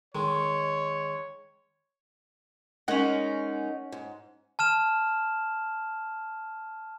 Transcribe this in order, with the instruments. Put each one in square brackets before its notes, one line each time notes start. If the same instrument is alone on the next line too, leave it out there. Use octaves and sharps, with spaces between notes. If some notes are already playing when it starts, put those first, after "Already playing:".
[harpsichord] D#3 G#3 [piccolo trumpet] C#5
[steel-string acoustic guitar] G#3 D#4 A#4 [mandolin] C#4 F#5
[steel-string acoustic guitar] G#2
[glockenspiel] A5 F6 E7